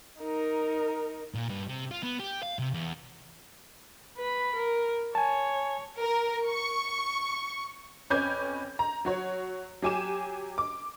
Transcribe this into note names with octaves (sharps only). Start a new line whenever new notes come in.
D#4 A#4
A#2
G2
C3
F4
B3
G4
F5
C3
E2
B4 B5
A#4
C#5 G#5 A5
A#4
C#6
F2 C#4 B4 D6 G6 G#6
A#5
F#3 F#4 C#5
F#3 G4 G#5 D6 E7
D6